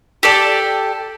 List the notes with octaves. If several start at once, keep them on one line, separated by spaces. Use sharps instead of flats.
G4 A4 D5 A5